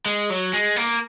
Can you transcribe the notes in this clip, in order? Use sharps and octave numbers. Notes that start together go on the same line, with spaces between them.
G#3
F#3
G#3
A#3